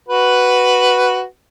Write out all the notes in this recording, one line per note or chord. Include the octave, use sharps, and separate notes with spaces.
F#4 B4